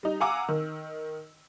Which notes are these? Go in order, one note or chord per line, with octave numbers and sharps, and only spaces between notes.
G3 D#4
F5 F#5 G#5 A#5 D6 E6
D#3